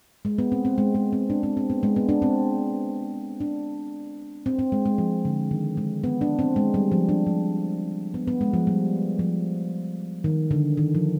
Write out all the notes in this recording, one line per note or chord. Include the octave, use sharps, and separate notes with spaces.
G#3
B3
C4
C4
G#3
G#3
C4
D4
C4
C4
B3
G#3
B3
D4
C4
D4
C4
C4
G#3
G#3
F3
D3
D#3
G#3
B3
D4
C4
G#3
G3
F3
D4
F3
B3
B3
G#3
F3
G3
F3
D#3
D3
D#3
F3